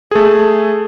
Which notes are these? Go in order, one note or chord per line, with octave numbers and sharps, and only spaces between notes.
A3 G#4 A4